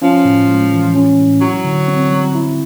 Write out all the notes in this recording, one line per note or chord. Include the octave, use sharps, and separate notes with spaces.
F3 C#4
A2
G#3
E3
C#4
A2
F#3 E4
D3
C4
G3
E4